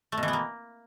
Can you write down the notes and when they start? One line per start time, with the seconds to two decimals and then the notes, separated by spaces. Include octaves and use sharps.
0.12 A3
0.18 B2
0.23 E3
0.28 B3
0.33 A#3